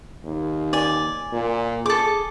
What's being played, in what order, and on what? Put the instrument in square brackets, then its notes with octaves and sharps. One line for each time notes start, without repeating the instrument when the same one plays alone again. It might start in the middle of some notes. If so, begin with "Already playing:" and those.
[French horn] D#2
[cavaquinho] D5 G#5
[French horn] A#2
[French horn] G#4 [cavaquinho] A4 D6